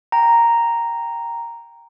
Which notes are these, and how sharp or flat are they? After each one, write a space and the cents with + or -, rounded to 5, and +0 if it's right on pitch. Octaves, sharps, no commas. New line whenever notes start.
G5 +0 A#5 +0